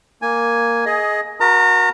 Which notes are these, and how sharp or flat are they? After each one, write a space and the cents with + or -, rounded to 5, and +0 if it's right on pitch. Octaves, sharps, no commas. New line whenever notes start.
A#3 +0 G#5 +0
G#4 +20 D#5 +10
F#4 -25 A#4 +30 A#5 -35